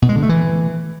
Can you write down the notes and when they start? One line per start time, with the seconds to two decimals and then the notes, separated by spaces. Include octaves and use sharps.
0.02 B2
0.09 G#3
0.16 D3
0.22 A3
0.29 E3